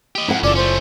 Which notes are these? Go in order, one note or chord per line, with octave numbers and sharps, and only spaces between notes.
G4 D#5
F2 E4 F#5
F#1 C#4 F4 A4 D5 D6
A3 C#4 C5